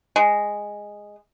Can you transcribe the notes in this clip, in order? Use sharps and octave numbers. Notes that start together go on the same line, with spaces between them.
G#3